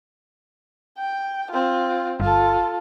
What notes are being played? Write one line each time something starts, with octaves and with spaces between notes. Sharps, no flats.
G5
C4 F4
G1 F4 A4